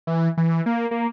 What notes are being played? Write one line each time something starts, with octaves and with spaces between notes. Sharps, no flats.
E3
E3
A#3
A#3